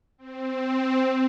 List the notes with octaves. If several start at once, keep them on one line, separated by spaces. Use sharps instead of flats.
C4